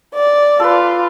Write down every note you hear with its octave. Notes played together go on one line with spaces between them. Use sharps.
D5
F4 A4 B4